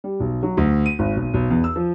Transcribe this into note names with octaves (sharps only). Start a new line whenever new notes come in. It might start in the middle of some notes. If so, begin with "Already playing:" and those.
G3
B1
F#3
D2
D#7
G#1
B1
B1
E2
E6
F3